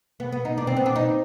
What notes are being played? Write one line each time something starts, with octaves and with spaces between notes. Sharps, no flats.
B3
B3
D#4
D4
C4
B3
D4
D#4